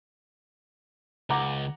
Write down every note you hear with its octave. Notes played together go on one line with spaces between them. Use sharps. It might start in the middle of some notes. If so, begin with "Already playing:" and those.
C#2 F#5 A#5 D6